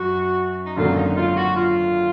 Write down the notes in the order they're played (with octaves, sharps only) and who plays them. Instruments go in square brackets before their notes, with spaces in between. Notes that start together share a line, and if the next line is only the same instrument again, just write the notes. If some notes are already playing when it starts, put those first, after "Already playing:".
Already playing: [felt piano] F#2 [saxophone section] F#4
[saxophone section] D#4
[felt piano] G#1 F#2 D3 F#3 A#3 [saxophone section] F4
[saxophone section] D#4
F4
F#4
F4